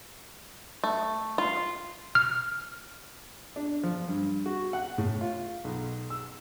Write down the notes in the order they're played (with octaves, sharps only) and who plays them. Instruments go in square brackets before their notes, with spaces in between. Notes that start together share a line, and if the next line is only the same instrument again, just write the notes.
[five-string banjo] A3
F4
[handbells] F6
[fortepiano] D4
F3
G2
F#4
F#5
A2
F4
B1
E6